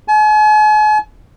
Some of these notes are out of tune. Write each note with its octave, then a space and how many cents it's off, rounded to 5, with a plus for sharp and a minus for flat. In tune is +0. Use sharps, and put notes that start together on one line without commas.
G#5 +45